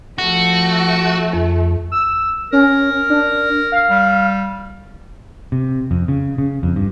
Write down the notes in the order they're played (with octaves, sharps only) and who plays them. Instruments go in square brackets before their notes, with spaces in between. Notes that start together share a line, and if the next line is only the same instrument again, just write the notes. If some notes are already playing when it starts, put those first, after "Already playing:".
[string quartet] F3 A3 [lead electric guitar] F#4
[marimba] F2
[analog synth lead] E6
[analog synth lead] C#4 [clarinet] A#4
[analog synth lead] D4
F5
[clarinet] G3
[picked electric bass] C3
F2
C#3
C#3
F2
G2